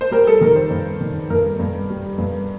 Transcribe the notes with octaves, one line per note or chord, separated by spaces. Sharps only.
C5
G3 A#4
A4
D#3 A#4
C5
G2
D#3
G2 A#4
G2
G3
G2